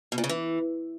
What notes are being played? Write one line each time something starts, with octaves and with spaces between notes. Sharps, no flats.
B2
A#2
C#3
E3